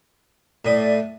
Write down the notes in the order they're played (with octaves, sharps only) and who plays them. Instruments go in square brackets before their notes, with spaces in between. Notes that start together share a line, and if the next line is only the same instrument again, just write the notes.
[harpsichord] A2 D#6 [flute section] D5